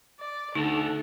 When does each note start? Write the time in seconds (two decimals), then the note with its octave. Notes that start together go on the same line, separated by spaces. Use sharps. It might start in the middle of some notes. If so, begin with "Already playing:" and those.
0.19 D5
0.55 D2 D3 D#4 A4